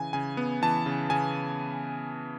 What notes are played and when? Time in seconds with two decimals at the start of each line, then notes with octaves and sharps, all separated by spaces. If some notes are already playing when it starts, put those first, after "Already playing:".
Already playing: C#3 E3 G#5
0.13 C#3 G#5
0.37 B3
0.62 E3 A5
0.86 C#3
1.10 C#3 G#5